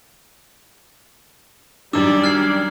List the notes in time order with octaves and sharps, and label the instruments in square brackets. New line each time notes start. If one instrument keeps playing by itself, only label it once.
[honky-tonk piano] F#2 D#3 [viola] G3 D5 [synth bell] D4 [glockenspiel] D6 E6
[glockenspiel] F6 G#6 C7